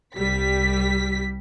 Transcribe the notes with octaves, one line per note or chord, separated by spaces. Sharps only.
C2 G3 B6